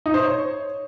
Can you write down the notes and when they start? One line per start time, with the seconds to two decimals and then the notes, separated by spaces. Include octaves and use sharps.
0.06 D#4
0.14 C5
0.22 C#5